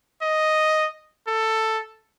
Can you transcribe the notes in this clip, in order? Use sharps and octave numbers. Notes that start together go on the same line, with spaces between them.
D#5
A4